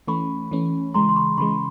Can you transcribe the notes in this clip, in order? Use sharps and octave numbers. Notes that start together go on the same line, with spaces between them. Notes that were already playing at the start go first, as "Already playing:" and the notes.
E3 A3 C#4 B5 C#6
E3 A3 C#4
C#3 E3 G#3 A#5 C6
C6
B5 C#6
C#3 E3 G#3 B5 C#6